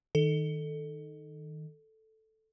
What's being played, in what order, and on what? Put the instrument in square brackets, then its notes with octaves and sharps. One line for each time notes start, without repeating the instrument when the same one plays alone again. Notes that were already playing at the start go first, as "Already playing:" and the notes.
[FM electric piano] D#3 [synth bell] A4